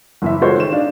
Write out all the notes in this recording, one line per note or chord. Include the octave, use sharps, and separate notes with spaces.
F#1 E3 E5
G#3 F4 F#4 A4 C5 C#5
D#3 E7
D4 D#4 F5